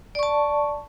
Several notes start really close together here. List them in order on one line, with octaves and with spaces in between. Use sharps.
D5 C#6 A5